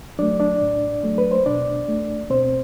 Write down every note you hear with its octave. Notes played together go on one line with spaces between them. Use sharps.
F#3 A3 D4 D5
D4 D5
A2
F#3 A3
B4
C5
B2 D4 D5
A3
B2 C4 C5